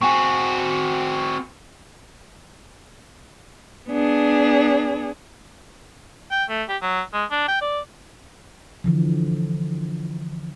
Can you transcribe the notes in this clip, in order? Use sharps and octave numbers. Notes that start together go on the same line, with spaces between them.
C4 F#4 G#5 C#6
B3 D4 G#4
G5
A3
G4
F#3
G#3
D4
G5
D5
D3 E3 F3